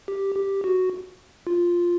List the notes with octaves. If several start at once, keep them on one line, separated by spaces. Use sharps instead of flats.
G4
G4
F#4
F4